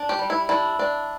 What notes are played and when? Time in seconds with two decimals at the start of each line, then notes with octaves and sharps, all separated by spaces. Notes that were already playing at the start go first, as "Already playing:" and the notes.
Already playing: D4
0.09 G4
0.19 G3
0.30 E4
0.49 D4 E4
0.79 D4